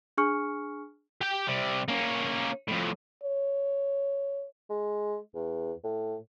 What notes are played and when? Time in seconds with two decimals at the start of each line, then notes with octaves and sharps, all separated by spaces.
0.17 D4 G#4 G#5 C#6 F6 C#7
1.21 G4 G5
1.48 C3 G3
1.88 A#3 C#4
2.68 F2 A2
3.24 C#5
4.70 G#3
5.35 E2
5.84 A2